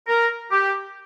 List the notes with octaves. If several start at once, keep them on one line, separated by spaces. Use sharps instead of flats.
A#4
G4